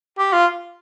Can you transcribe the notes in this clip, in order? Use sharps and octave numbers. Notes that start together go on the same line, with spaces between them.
G4
F4